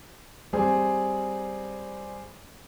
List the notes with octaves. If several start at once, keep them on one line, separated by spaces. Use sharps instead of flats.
G3 C4 G#4